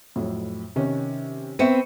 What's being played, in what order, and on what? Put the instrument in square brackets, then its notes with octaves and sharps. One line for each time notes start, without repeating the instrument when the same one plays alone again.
[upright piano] F2 A2 F#3
C3 D#3 C#4
[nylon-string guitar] B3 C4 E5 [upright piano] C#6 C#7 D#7